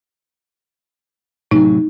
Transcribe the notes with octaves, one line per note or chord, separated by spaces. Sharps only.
A2 C3 F#3 D#4